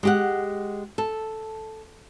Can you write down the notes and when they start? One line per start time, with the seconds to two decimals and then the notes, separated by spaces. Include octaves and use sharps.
0.03 G#3 G4 F#5
0.98 A4